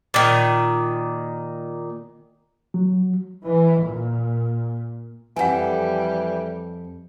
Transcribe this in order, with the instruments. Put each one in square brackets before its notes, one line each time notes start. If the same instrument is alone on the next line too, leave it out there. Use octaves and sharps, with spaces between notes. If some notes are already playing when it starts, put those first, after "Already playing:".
[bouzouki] A#2 D#3
[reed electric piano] F#3
[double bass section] E3
A#2
[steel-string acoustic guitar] F2 A4 [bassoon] E3 [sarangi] G3 [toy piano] F#5 G#5